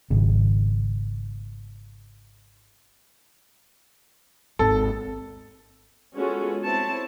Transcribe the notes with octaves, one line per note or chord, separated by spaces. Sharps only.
G#1 C#3
G#1 D#2 A4
G#3 B3 C#4 F4 F#4 A4
C4 E4 C#5 A5